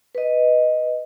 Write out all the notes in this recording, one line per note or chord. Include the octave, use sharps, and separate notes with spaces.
B4 D#5